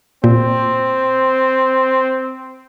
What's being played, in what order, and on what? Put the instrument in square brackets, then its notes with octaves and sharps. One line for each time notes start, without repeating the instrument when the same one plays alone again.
[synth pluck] A#2 [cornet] C4